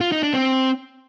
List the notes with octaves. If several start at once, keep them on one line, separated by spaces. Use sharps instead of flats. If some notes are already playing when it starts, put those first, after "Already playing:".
F4
D#4
D4
C4